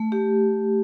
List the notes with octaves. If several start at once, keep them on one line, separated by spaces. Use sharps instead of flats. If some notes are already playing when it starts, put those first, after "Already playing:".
Already playing: A3
A3 G4